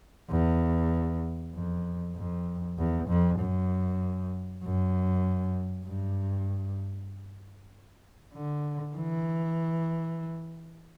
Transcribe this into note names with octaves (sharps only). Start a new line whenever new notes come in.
E2
F2
F2
E2
F2
F#2
F#2
G2
D3
E3